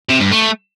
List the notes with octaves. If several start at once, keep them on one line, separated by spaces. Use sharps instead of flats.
C3
G2
A3